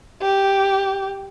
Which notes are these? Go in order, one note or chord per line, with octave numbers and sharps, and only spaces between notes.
G4